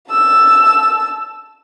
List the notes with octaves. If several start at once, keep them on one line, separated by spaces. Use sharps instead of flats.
A5 E6